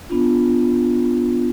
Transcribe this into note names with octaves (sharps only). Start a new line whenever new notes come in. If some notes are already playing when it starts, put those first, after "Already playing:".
B3 D4 F4